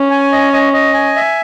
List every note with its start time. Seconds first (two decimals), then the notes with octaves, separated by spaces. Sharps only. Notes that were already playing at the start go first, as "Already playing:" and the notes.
Already playing: C#4
0.11 G#5
0.32 D#5
0.53 D#5
0.73 D#5
0.94 G#5
1.16 E5